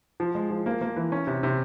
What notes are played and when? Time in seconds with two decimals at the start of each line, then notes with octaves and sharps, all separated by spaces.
0.20 F3
0.35 G#3
0.50 F3
0.66 A#3
0.81 A#3
0.96 E3
1.12 C#4
1.27 C3
1.43 C3